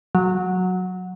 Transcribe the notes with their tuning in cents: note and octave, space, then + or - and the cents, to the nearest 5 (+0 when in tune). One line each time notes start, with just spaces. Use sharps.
F#3 -10